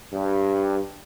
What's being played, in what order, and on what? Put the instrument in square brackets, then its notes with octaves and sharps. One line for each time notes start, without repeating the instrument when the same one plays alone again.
[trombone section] G2